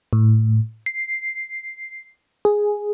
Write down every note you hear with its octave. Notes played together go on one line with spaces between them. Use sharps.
A2
C7
G#4